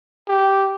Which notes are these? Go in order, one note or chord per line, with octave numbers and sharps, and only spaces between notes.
G4